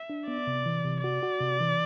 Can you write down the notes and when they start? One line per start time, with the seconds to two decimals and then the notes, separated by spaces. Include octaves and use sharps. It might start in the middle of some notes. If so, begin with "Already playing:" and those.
Already playing: E5
0.10 D4
0.28 B3 D5
0.47 C3
0.66 E3
0.85 C3
1.03 F#4 D5
1.23 F#4
1.40 C3
1.60 E3